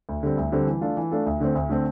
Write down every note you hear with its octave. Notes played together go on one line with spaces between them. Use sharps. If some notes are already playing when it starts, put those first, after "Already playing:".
D2
D3 G3 C4
D2
D3 G3 C4
E3
A3 D4 F4 A4
E3
A3 D4 F4 A4
D2
D3 A3 C4
D2
D3 A3 C4